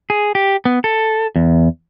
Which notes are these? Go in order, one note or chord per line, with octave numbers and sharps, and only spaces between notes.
G#4
G4
B3
A4
E2